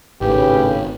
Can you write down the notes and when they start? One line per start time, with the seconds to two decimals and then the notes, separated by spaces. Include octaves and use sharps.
0.21 G#1 A2 C#3 G4 B4